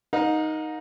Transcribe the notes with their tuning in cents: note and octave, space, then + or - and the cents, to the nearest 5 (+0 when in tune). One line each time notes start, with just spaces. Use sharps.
D#4 +0 A#4 +0 F#5 -45